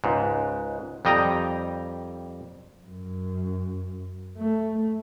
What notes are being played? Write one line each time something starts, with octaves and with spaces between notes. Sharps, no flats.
C#2 G#2
F2 G3 D#5 G5 A#5
F#2
A3